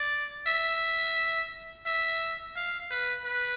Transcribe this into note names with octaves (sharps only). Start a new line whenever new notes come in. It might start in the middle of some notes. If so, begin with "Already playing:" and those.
Already playing: D5
E5
E5
F5
B4
B4